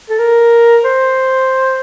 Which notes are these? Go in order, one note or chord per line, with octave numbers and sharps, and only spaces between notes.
A4
A#4
C5